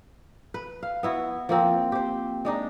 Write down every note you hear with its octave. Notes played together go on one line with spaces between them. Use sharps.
B4
F5
B3 E4 F#4
F3 A#3 C4
G4 C5
G#3 D4 D#4